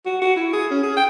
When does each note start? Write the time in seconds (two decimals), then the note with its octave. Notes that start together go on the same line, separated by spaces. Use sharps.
0.05 F#4
0.21 F#4
0.36 E4
0.53 G#4
0.71 C#4
0.83 G#4
0.97 G5